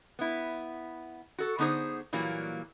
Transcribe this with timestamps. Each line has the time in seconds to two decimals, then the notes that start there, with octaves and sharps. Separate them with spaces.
0.19 B3 E4
1.38 F#4 A4
1.58 D3 B3 D#4 G#4 C5
2.13 A#2 E3 F#3 G3 A#3